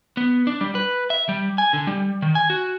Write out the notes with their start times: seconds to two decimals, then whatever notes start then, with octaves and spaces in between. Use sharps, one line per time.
0.17 B3
0.47 D4
0.61 G3
0.75 B4
1.10 E5
1.29 G3
1.58 G#5
1.73 D3
1.87 G3
2.22 D#3
2.35 G#5
2.50 F#4